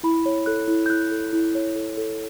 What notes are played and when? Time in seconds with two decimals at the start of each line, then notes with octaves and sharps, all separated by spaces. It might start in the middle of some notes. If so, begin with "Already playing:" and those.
0.03 E4 B5
0.26 C#5
0.46 A4 F#6
0.68 E4
0.86 G6
0.89 E4 F#6
1.11 A4
1.33 E4
1.55 C#5
1.76 A4
1.97 A4